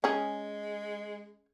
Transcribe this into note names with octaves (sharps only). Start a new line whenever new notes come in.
G#3 C#4 G#4